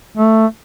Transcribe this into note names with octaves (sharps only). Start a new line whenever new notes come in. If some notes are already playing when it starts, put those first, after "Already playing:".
A3